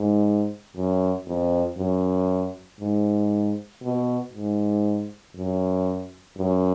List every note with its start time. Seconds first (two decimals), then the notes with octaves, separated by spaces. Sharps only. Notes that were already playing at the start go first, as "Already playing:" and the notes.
Already playing: G#2
0.75 F#2
1.27 F2
1.78 F#2
2.80 G#2
3.82 B2
4.33 G#2
5.35 F#2
6.37 F#2